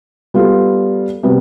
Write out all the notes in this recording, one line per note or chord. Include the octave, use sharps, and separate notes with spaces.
G3 B3 F4 A4
C3 G3 B3